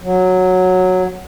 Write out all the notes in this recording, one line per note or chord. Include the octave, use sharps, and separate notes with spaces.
F#3